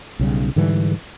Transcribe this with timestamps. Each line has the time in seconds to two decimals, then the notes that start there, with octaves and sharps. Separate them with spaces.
0.19 B1 C#3 G3
0.56 G#2 D3 E3 G3